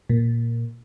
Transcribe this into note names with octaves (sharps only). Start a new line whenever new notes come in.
A#2